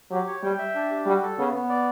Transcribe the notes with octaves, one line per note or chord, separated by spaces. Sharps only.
F#3 G4
C#5
G3 G5
E5
D4
G4
G3 F#4
A4
C#3 B3
B3
D5